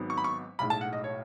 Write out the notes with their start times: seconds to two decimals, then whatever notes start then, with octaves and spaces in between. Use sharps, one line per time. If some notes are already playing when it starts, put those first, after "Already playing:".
Already playing: G#1 G#2 F#3 B3
0.10 C#6
0.18 B5
0.24 C#6
0.59 B1 A2 G#3 B5
0.70 A5
0.81 F#5
0.93 D#5
1.04 C#5